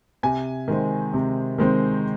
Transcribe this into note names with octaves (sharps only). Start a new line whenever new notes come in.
C3 G#5
D#3 G#3 C4
C3
D#3 G#3 C4